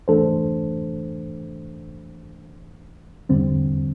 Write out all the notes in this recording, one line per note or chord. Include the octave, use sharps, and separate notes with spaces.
E3 A3 D4 A4 C5
E2 D3 G3 C4